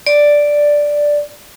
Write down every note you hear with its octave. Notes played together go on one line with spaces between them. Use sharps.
D5